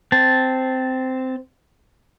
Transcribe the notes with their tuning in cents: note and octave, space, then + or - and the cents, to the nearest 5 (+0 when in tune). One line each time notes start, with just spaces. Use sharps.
C4 -10 A5 +0